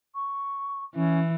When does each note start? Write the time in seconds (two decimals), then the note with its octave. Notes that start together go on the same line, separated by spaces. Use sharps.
0.15 C#6
0.95 E3 C#4